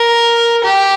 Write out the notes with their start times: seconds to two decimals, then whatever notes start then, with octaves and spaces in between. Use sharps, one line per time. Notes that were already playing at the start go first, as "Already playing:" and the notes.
Already playing: A#4
0.63 G4